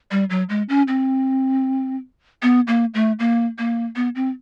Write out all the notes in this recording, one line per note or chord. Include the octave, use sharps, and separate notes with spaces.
G3
F#3
G#3
C#4
C4
B3
A#3
A3
A#3
A#3
B3
C4